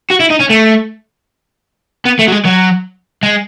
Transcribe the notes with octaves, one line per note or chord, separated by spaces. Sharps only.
F#4
E4
D#4
C#4
A3
B3
A3
F#3
G#3
F#3
G#3